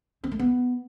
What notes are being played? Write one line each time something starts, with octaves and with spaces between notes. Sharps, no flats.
C4
A3
B3